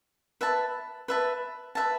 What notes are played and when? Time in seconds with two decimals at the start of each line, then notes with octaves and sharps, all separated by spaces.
0.41 B4 E5 A5
1.08 B4 E5 A5
1.75 B4 E5 A5